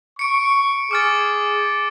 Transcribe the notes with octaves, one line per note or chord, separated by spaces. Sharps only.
C#6 C#7 D7
G#4 D6 F6 A6